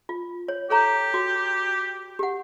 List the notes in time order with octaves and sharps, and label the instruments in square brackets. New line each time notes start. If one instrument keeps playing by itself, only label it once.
[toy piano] F4
C#5
[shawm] G4 [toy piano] A4 C#5 A#5
[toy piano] F#4
G4 F#5